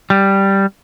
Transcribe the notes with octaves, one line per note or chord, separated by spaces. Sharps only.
G3